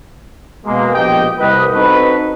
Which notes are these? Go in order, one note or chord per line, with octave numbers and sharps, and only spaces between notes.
B2 G#3 A#3
A#1 B3 G4 D#5 G5
C2 B4 D#5
C4 D#4 F#4 A4 B4